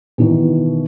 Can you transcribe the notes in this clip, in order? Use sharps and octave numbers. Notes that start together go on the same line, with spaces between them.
B2 D#3 E3